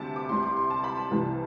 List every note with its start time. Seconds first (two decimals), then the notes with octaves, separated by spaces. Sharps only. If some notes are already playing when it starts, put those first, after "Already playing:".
Already playing: D2 C3 G3 A5
0.16 D6
0.29 C2 C3 G3 C6
0.43 D6
0.56 C6
0.70 A5
0.84 B5
0.97 A5
1.11 C2 C3 E3 G3